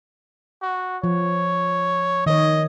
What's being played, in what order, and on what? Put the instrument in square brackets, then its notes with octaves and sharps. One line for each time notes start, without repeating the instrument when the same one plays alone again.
[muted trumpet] F#4
[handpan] F3 [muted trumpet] C#5
[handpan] D#3 C#5 [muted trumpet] D#5